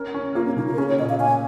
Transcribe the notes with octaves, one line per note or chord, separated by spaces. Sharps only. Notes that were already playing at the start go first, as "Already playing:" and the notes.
Already playing: C#4 A#4
C#4
A#3 F4
C#4
C#3 D#4
F4
A#4
C#4 G#4
C#5
A#2 D#5
F5
C#4 G#5